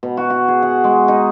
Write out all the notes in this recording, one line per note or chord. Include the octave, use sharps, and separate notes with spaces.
B2
F#4
F#4
G#4
F#5
G#3
D#4